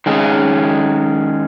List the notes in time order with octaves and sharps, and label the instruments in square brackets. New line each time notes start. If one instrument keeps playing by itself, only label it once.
[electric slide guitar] D#3 G#3 C#4 G#4